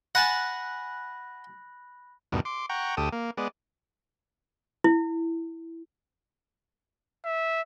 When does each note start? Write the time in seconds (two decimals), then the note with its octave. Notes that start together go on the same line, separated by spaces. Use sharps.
0.15 F#5 G#5 A5 B5 F#6 A#6
2.32 D2 G2 B2 D#3
2.45 C6 D6
2.69 F#5 G5 A#5 C#6
2.97 D2 G4 A4 D#6
3.13 A#3
3.37 G#3 B3 D5
4.84 E4
7.25 E5